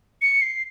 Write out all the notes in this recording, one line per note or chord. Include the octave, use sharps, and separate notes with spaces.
C#7
C7